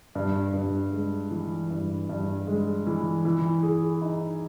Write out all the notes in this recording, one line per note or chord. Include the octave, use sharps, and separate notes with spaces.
G2
G2
G#3
E3
G2
G2
G#3
E3
E3
G#4
D#4